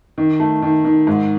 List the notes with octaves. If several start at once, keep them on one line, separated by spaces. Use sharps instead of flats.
D#3
A3
D#3
D#3
G#2